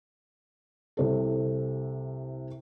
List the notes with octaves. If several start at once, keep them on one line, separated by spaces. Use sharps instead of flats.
C2 C3 A4